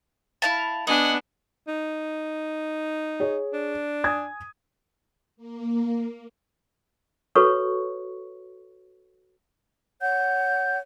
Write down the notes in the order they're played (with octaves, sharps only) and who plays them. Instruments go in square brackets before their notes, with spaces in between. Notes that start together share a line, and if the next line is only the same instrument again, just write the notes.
[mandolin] E4 F5 A5
[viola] B3 D4 [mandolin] D#5 [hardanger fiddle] F#5 G#5
[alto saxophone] D#4
[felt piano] G#4 C#5
[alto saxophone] D4
[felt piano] G#5 D#6 G#6
[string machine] A#3
[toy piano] F#4 A4 B4 C#5 C#6
[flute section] C#5 F#5 G6